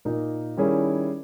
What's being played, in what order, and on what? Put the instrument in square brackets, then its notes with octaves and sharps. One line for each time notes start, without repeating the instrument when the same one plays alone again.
[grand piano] A#2 A#3 D#4
D#3 G3 C#4 E4 G#4